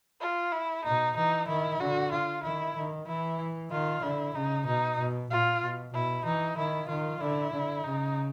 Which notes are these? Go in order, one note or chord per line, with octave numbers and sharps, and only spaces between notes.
F4
E4
B2 D#4
E3 D#4
D#3 E4
D3 F#4
F4
D#3 E4
D#3
E3 E4
D#3 F4
D3 E4
C#3 D#4
B2 D#4
B2
A#2 F4
B2
B2 E4
E3 D#4
D#3 E4
D#3 F4
D3 E4
D3
C#3 D#4